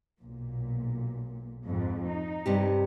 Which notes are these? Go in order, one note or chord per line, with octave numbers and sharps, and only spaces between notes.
B1 A#2
F2 G#2
D#4
G2 C3 G4